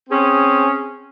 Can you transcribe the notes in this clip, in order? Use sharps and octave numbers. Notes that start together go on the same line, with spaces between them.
C4 C#4 G#4